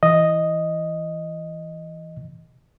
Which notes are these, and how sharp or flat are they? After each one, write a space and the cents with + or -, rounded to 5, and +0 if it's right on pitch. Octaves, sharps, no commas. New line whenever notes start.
E3 +0 D#5 +0